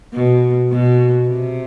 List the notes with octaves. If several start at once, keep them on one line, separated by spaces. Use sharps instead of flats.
B2
B2
C3